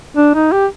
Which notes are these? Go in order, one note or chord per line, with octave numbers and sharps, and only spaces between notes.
D4
D#4
G4